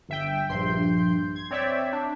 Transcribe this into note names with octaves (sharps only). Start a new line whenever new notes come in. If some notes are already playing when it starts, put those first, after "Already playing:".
G1 E5 G5
A#1 G2 C6 G6
G#6
C4 C#5 D5 E5 G5
D4